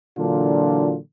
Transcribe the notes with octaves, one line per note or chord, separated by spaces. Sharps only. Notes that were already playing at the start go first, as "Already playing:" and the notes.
A#2 D3 E3 F#3 D4 F4